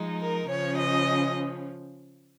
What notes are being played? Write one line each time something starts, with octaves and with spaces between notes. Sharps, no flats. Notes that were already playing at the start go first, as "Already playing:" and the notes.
Already playing: F3 G#3 D#4
A#4
C#3 F3 C#4 C#5
D#5